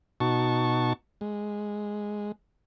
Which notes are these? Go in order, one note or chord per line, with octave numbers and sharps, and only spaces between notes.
B2 D#4 F#4 A5 C#6
G#3